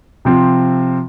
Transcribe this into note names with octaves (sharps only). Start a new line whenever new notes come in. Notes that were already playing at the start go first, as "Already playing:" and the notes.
C3 F3 C4